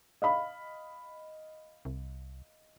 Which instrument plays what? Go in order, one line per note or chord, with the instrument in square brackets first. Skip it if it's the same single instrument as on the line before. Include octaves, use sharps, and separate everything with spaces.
[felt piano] D#5 F5 B5
[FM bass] C2